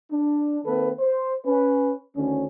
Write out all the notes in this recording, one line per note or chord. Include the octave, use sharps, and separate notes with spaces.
D4
D#3 A#3 C4 A4 B4
C5
C#4 B4
D2 D3 D#3 C#4